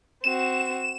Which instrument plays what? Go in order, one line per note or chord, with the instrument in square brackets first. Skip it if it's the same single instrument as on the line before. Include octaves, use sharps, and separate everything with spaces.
[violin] C4 F#4 [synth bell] E7